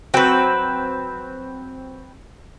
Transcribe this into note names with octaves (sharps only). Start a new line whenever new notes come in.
F#3 C4 F#4 B4 G5